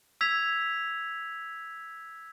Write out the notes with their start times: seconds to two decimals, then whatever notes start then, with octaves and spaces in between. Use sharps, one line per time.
0.21 E6 G#6 B6 F7